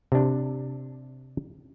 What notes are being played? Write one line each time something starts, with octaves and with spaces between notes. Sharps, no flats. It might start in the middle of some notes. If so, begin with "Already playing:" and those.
C3 D4